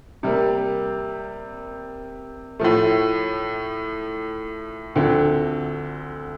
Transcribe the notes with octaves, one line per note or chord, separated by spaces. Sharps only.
C3 G3 A#3
A2 F3 A3
D2 D3 F3 C4